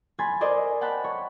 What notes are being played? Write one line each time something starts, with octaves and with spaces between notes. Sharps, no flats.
G#5 B5 C6 G#6 A6
A#4 C5 D5 D#5 G#5
F#5 G5 A5 B5 F#6
C#5